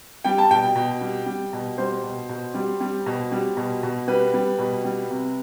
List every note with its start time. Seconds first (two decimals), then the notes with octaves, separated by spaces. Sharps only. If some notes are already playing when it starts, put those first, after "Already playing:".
0.24 G3 G5
0.38 A5
0.50 B2 G5
0.76 B2
1.01 G3
1.26 G3
1.53 B2
1.78 G3 C5
2.04 B2
2.29 B2
2.54 G3
2.80 G3
3.06 B2
3.32 G3
3.57 B2
3.83 B2
4.07 G3 B4
4.34 G3
4.59 B2
4.84 G3
5.10 C3